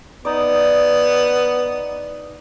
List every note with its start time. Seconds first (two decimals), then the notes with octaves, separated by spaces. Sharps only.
0.25 B3 D#4 D5